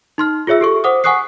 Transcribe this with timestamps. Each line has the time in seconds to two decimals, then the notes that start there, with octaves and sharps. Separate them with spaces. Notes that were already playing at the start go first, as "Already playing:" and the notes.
0.18 D#4 C6 F6
0.47 F4 G#4 C#5 E5 E6
0.61 G4 A4 C#6
0.84 C5 F#5 D6 D#6
1.04 F#5 G#5 C#6 D#6 F#6 C7